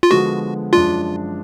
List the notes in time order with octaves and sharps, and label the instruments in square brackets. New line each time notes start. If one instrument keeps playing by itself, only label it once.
[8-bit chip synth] F4
[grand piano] D3 F3 G#3 B3 [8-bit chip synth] F#4
[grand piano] F#2 F3 G#3 D4 [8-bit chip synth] F4